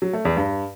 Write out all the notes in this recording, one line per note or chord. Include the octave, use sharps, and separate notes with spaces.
F#3
A3
E2
G2